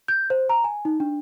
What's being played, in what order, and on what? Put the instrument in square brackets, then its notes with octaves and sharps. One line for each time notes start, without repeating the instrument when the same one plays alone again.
[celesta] G6
C5
A#5
G#5
D#4
D4